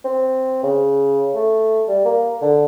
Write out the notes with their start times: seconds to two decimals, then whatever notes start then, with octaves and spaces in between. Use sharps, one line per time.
0.05 C4
0.63 C#3
1.35 A3
1.88 G3
2.05 A#3
2.41 D3